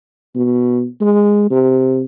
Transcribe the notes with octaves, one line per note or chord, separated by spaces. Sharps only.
B2
G#3
C3